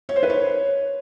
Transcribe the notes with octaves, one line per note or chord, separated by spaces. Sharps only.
C#5
C5
B4
C#5